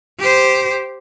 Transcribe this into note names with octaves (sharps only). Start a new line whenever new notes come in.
G4 C5